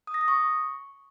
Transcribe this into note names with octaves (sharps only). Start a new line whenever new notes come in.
D#6
A#6
D#6
C#6